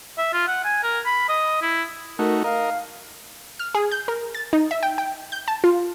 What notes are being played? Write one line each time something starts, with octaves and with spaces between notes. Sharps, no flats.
E5
F4
F#5
G#5
A#4
B5
D#5
E4
A3 D#4 F#4 A#4
A#4 D#5 F5
F6
G#4
G6
A#4
A6
D#4
E5
G5
G5
G6
A5
F4